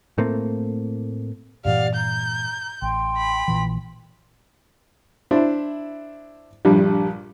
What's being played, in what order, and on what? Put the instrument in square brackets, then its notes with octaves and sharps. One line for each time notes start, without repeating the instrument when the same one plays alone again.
[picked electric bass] A2 A3 A#3 C4
[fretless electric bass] G2 A#2 E3 [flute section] G4 D5 F#5 [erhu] F5
[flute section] A#5 [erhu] G6
[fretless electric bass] A1 [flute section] G5 C6
[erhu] B5
[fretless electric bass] A#1 A#2 E3
[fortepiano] D4 E4 C5
A#1 G2 G3